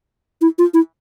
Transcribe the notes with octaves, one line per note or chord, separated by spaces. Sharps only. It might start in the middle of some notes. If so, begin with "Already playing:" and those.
E4
F4
E4